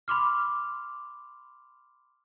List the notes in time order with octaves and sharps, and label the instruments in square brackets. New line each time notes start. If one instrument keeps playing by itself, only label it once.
[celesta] B5 C6 D6 F6